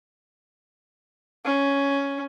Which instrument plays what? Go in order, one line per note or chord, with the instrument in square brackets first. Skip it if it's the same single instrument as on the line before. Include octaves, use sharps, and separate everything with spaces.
[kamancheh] C#4